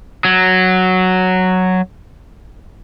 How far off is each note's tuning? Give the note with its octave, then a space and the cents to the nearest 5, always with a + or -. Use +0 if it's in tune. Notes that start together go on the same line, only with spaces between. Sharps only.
F#3 +0